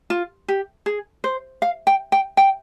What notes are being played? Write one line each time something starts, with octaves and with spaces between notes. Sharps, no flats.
F4
G4
G#4
C5
F5
G5
G5
G5